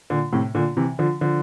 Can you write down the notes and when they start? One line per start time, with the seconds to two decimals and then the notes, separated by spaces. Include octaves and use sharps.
0.10 A#2 D3
0.33 A2 C3
0.55 A#2 D3
0.77 C3 E3
0.99 D3 F3
1.21 D3 F3